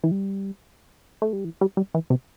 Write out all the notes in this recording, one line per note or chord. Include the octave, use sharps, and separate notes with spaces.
E3
G3
A3
G3
E3
G3
G3
E3
C3